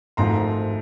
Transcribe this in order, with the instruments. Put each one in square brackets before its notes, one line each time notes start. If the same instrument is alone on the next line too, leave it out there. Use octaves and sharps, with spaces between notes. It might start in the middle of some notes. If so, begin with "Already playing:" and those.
[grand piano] G#1 G#2 F3 A3 A#5 C6